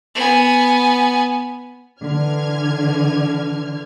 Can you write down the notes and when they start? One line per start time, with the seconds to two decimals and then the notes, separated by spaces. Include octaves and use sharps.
0.15 B3 G#5
2.02 D3 E3 F6 G#6